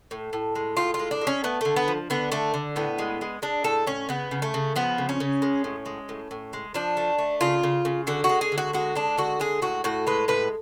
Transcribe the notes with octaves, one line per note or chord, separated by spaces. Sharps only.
A2
A2
G#3
A2 F4
F4
G#3
D4
G#3
C#4
A3 B3
D3 A3
B3
F3
D3 B3
D3 A3
D3
A2 B3
G#3
G#3
G#3 D4
A2 A4
A2 C#4
C#3 B3
C#3
A3
C#3
F3 B3
C#3
C#4
C#3
G#3
A2
G#3
A2
A2
G#3
F3 D4
A3
A3
C#3 F4
C#3
C#3
D3 F#4
F#4
G#3
G#4
D3
F#4
G#3 F#4
G#3 D4
D3 F#4
G#3 G#4
A2 F#4
A2 F#4
G#3 B4
A2 B4